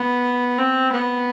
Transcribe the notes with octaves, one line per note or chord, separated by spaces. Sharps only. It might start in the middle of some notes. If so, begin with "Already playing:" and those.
Already playing: B3
C4
B3